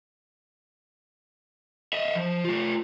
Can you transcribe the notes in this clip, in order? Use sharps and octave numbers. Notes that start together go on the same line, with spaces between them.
D#5 E5
F3
A3 F4